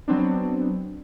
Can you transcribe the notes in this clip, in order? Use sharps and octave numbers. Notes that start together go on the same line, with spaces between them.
F#3 B3 C4 D4